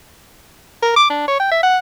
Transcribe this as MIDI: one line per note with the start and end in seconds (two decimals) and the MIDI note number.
0.82 0.94 70
0.96 1.07 86
1.10 1.24 62
1.28 1.39 73
1.40 1.48 79
1.51 1.59 76
1.63 1.78 78